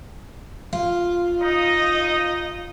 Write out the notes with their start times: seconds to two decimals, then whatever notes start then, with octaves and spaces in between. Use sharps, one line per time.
0.73 F4
1.42 D#4 D#5